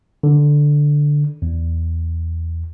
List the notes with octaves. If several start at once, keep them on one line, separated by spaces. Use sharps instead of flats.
D3
E2